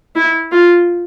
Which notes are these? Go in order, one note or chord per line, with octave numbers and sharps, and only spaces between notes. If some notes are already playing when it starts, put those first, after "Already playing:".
E4
F4